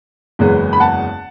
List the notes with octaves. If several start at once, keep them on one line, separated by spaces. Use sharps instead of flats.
F#1 E2 C#3 G#3 B3
B5
F#5 A5